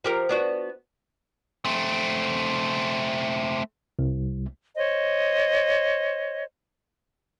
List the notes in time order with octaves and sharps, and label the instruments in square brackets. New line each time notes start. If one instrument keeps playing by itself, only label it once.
[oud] F3 G4 A#4
B3 D4 F#4
[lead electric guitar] A3 C4
[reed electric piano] C2
[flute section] C5 C#5 D#5